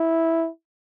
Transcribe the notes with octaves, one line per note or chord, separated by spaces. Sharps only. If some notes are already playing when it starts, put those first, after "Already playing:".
Already playing: E4